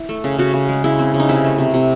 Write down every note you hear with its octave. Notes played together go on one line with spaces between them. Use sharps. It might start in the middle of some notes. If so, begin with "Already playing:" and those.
Already playing: E4
A3
C#3
C#3 F#4
C#3
G#3
C#3 E4
C4
C#3
D#4
C3 E4
A3
C3
C3